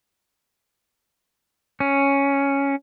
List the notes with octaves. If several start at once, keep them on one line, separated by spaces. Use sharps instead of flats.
C#4